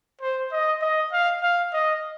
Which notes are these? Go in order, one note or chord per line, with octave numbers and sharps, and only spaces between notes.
C5
D#5
D#5
F5
F5
D#5